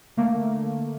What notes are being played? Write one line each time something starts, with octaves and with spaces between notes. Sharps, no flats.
D3 A3 A#3